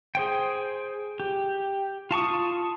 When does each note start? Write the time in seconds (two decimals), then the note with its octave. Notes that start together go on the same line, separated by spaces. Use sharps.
0.15 G#4 C5 G5
1.20 G4
2.11 F4 A5 C#6 D#6